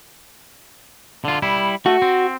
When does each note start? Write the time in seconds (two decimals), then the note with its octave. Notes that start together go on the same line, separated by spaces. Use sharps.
1.25 D3 F4
1.42 G3 E4
1.86 A3 F#4
2.02 C4